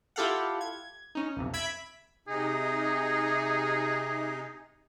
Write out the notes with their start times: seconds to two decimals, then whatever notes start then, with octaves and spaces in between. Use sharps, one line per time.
0.16 E4 F4 G4 A4 F5 F#5
0.61 G#6
1.15 C#4 D#4
1.37 B1 F2 C3
1.54 E5 B5 G#6 B6 D7
2.28 C3 D#4 G#4